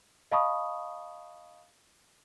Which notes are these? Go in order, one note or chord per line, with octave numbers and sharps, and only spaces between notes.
D#5 F5 A5 B5 C#6 D#6